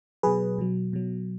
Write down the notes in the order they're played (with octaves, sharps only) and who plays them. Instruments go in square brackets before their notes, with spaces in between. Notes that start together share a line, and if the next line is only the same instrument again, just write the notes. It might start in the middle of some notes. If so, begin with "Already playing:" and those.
[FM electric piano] B2 F#3 G#4 B4
B2 F#3
B2 F#3